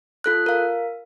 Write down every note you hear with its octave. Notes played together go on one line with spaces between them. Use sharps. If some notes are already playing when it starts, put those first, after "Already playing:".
F4 A4 F#6
A#4 F5